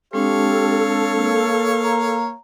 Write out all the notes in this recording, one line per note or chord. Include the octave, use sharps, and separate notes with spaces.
G#3 C4 D4 G4 A4 C#5 F5
A#3
A#5